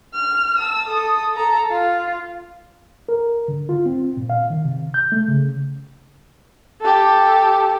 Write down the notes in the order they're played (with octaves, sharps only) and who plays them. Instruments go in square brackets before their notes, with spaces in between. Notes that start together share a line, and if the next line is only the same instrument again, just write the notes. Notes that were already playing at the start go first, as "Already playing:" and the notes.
[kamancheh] F6
A5 E6
A4 D#6
A4 A#5
F4
[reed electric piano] A#4
D3
F4
C4
A#2
F5
D#3
C3
G6
A3
C#3
[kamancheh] G4 A4